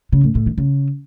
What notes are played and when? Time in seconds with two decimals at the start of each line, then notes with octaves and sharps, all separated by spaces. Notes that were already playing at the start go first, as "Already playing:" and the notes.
0.12 C#3
0.24 A2
0.35 A2
0.46 D#3
0.58 C#3